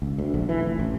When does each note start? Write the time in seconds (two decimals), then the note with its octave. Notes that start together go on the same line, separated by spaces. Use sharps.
0.02 C#2
0.18 D2
0.34 A#1
0.49 E3
0.61 F1
0.79 A1